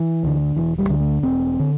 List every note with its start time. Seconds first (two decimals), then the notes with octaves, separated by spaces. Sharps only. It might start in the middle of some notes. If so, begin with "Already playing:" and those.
Already playing: E3
0.23 D2 D3
0.56 E1 E3
0.79 G3
0.89 D2 D3
1.00 A3
1.23 E1 C4
1.60 D3